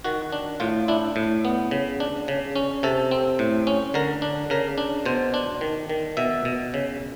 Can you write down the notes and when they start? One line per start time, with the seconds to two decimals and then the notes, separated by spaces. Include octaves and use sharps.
0.04 D#3 F#4
0.32 D4
0.60 A2 F4
0.88 D4 E4
1.16 A2
1.45 B3
1.71 C#3
2.00 D4
2.28 C#3
2.56 C#4
2.83 C3 A4
3.11 C4
3.39 A2
3.67 C#4
3.94 D3 A#4
4.22 D4
4.50 C#3 A#4
4.78 D4
5.05 B2 C5
5.34 D4
5.61 D#3
5.89 D#3
6.17 B2 E5
6.45 B2
6.74 C#3